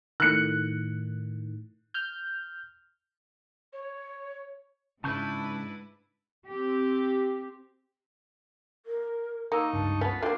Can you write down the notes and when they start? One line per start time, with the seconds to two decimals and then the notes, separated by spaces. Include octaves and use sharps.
0.20 A2 D#3 F#6 C#7
1.94 F6 G6
3.73 C#5
5.04 G#2 C#3 D4 E4 B4 A5 C#6 G6
6.47 C4 G4
8.86 A#4
9.52 A#3 D#4 A#5 C#6 E6
9.73 C#2 G2 A5
10.01 B3 C#4 F4 B4
10.22 A3 A#3 D4 F#4 C5 G5 F6